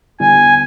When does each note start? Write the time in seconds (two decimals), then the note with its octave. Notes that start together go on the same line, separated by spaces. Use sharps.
0.20 D3 G3 B3 E4 G#5